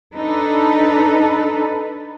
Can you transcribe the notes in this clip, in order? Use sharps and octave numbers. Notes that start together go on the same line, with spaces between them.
D4 D#4 A4 B4